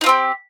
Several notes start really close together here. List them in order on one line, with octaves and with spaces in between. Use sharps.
D#4 F4 C4 G4